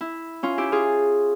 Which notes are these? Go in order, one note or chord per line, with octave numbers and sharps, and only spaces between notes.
E4
C#4 F4
E4 G4
F4 G#4